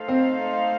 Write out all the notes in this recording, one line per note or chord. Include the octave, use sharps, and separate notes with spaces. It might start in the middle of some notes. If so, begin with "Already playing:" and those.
Already playing: A3 D#4 A4 C5 F5
C4